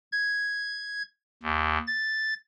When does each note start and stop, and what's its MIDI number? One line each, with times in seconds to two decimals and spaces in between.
0.12 1.02 92
1.43 1.78 39
1.87 2.34 93